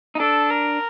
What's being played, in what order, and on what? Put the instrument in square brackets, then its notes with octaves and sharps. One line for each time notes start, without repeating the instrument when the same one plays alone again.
[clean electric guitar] D#4
[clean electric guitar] D4 [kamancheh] A4
[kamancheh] A#4